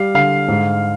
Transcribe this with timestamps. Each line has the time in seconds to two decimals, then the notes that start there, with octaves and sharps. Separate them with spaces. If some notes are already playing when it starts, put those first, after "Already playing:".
Already playing: G3 F5
0.14 D3 F5
0.48 G#2